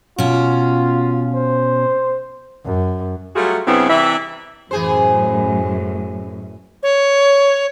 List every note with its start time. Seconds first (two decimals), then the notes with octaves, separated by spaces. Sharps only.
0.18 B2 C#4 F4
1.34 C5
2.64 F#2
3.36 F#3 G3 A3 F4 F#4 G#4
3.67 G2 C#3 G3 B3 C4 E4
3.89 C3 E3 D5 E5
4.71 F#2 A2 E3 G#4 C5
6.83 C#5